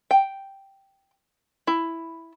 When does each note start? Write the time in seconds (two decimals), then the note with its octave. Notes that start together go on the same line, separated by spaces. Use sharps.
0.11 G5
1.67 E4